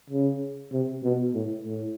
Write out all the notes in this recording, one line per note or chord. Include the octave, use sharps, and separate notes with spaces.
C#3
C3
B2
A2
A2